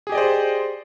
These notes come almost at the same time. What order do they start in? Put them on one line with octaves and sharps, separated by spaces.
G#4 G4 D#5 D5 C5